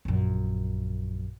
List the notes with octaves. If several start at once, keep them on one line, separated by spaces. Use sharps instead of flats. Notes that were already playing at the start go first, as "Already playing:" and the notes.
A#1 F#2